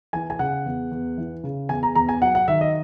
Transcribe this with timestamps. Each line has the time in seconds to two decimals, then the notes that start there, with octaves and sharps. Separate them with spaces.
0.13 E3 G#5
0.30 G#5
0.39 C#3 F#5
0.66 E2
0.91 E2
1.18 E3
1.44 C#3
1.69 E2 G#5
1.83 A#5
1.95 E2 A#5
2.09 G#5
2.21 F#3 F#5
2.35 F#5
2.48 D#3 E5
2.61 D#5